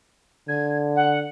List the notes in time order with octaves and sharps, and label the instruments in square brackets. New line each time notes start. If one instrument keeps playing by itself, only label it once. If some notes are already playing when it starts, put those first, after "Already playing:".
[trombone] D3 [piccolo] G#6
[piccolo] F#5